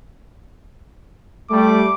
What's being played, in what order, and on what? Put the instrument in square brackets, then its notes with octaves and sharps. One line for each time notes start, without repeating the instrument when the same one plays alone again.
[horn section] G3 A3 [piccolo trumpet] D6